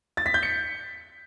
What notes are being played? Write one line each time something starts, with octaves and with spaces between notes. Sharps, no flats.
A6
B6
G6
C#7